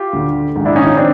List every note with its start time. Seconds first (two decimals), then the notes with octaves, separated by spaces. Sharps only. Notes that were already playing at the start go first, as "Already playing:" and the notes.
Already playing: F4 G4
0.13 D2 D3
0.55 A#1 G#2 D#3
0.65 D4 E4
0.76 C#4 D#4
0.86 C#4 D#4
0.97 C4 D4